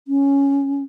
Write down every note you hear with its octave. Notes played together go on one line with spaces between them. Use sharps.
C#4